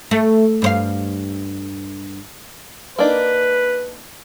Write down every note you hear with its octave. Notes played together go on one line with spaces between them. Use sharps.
A3
G2 C5 F5
A#3 D4 D#4 B4